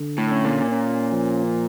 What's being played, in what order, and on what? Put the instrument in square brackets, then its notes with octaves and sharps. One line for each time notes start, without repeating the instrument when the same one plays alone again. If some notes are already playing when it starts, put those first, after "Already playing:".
Already playing: [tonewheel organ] D3
[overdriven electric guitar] A2
[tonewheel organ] C#4
[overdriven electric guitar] A#2
[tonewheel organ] C#4
F3